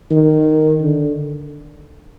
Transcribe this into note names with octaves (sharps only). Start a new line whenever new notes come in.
D#3
D3